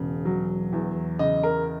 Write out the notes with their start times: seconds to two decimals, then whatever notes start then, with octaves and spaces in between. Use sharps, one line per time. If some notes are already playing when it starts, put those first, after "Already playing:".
Already playing: E1 C#3
0.25 F#3
0.73 E2
1.19 C#3 D#5
1.43 A#4